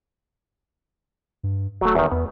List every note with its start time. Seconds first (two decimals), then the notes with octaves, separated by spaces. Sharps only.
1.43 G2
1.81 D#1 F#3 A3
1.95 E2 D#3
2.11 E2 B3